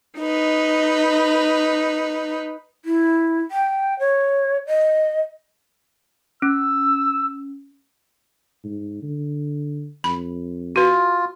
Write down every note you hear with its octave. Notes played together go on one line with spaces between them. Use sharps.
D#4 B4 D#5
E4
G5
C#5
D#5
C#4 E6
G#2
D3
F2 B5
F4 F#4 B4